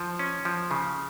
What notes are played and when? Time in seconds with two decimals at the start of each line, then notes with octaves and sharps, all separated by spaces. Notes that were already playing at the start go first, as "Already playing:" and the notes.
Already playing: F3
0.19 C#4
0.45 F3
0.71 C#3